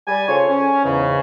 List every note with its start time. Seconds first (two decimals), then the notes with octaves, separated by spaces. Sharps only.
0.07 G3 G#5
0.29 C#3 F4 A4 C5 C#5
0.49 C#4
0.85 E2 G#2 C#3